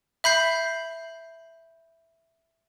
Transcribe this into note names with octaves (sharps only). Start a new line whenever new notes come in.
E5 B5 G6 C7